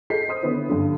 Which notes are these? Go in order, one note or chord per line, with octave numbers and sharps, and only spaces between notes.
G#4 A4 D#5 G6 B6 C7
C5 D#5 C6 D#6
D3 D#3 B3 C#4 E4
G2 D3